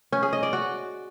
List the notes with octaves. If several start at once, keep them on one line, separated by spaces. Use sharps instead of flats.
C#4
G#4
D#5
D5
F#4